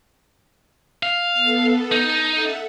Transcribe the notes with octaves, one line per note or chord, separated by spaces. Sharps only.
F5
B3 A4
D#4 A5
A4 E5 F#5